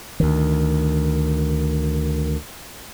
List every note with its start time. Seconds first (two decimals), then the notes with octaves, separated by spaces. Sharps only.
0.20 D2 D#3